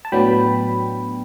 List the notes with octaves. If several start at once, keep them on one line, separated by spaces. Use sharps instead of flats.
A5
A2 F#3 B3 D4 G5 B5